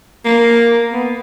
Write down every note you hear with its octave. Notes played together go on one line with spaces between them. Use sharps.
A#3
B3